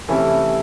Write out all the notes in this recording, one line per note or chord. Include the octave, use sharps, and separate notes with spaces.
C3 E3 A3 C#4 E4